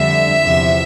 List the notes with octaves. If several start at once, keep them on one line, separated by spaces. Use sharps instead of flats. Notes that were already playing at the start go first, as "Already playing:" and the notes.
Already playing: F2 D3 G3 E5
E2 C3 F3